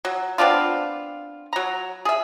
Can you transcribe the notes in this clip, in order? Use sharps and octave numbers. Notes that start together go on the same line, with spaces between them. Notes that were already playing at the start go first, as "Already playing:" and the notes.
F#3
B3 C4 D4 F4
F#3 A#5
G#4 E5